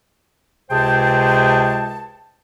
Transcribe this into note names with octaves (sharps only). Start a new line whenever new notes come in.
C#2 C3 G#4 C5 G5 A5